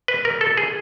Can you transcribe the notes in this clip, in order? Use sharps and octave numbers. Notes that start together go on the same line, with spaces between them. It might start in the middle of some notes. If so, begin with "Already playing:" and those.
B4
A#4
A4
G#4